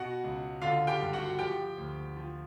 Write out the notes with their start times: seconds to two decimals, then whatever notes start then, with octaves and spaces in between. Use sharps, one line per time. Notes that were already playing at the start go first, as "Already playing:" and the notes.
Already playing: B2 F#4 F#5
0.24 C#2
0.62 D3 F4 F5
0.87 G4 G5
1.01 G2
1.13 F#4 F#5
1.39 F3 G4 G5
1.78 D2
2.17 F3